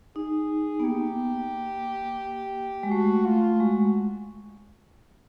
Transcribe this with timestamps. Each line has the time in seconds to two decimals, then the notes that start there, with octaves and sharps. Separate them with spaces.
0.16 D#4 G#4
0.80 B3
0.85 A#3 G4
2.83 G#3
2.91 A3 F#4
3.26 F4
3.60 G#3 F#4